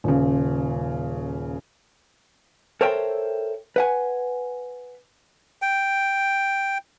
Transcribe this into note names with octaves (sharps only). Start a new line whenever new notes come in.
D#1 C#3
A4 A#4 C5 C#5 E5 G5
B4 F#5 G#5
G5